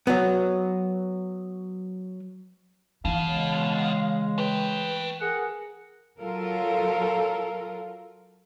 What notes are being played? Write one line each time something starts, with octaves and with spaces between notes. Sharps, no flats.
F#3 B3
B2 E3 F5
C#3 G#3
A3 B4 G5
G#4 A#4 F#5
F#3 F4 A4 A#4